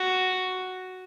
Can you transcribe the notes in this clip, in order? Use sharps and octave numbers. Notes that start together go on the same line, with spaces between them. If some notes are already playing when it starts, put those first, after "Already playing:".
Already playing: F#4